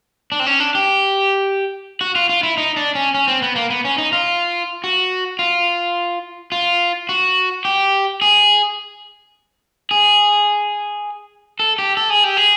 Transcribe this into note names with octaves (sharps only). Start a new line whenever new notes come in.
D4
C4
C#4
D4
G4
F#4
F4
F4
E4
D#4
D4
C#4
C#4
C4
B3
A#3
B3
C#4
D#4
F4
F#4
F4
F4
F#4
G4
G#4
G#4
A4
G4
A4
G#4
G4
G#4